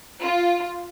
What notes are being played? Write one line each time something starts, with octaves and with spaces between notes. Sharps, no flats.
F4